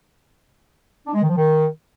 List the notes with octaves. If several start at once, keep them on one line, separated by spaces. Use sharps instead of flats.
D4
G#3
D#3
F3
D#3